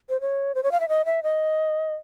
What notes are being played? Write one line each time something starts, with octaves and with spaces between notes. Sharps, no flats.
C5
C#5
C5
C#5
F5
E5
D#5
E5
D#5